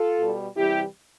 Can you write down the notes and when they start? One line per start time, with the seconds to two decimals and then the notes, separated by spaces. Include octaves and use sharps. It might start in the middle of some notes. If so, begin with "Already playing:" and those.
Already playing: F4 A4
0.19 B2 G3
0.55 C3 E3 G3 E4 G4